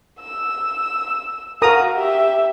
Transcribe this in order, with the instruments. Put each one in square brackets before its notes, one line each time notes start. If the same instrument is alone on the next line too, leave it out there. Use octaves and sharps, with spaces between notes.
[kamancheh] E6
[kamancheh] F#4 F5 [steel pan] A#4 A#5 D#6
[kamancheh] G4 E5